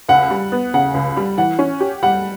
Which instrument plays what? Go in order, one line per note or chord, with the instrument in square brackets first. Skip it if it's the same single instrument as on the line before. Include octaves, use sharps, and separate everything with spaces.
[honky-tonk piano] C#2 [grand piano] F#5
[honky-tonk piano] G3
B3
[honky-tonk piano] C#3 [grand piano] F#5
[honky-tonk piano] C#2
G3
[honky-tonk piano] E3 [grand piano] F#5
[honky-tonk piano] C#4
G4
[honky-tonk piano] G3 [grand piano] F#5